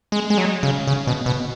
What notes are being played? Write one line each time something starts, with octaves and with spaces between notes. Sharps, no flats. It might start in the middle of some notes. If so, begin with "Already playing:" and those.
G#3
G#3
F#3
C#3
C#3
B2
B2